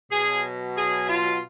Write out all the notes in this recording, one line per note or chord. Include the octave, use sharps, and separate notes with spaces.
B2 F#3 G#4
G#4
F4